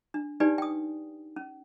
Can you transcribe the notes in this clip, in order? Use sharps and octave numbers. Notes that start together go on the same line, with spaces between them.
D4
D4 D#4 G4 B4 D5 G#5
G5 D#6
C#4